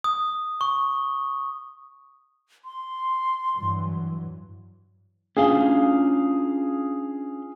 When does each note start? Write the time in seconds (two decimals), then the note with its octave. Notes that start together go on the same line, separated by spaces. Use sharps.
0.04 D#6
0.61 C#6
2.65 C6
3.56 G2 E3 F#3
5.37 C#4 D4 F4 G#4 F5